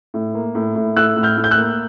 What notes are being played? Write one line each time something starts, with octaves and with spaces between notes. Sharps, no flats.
A2
A#3
A2
A2
A2 E6 F#6
A2
F6 G6
A2
G6
E6 F#6
A#3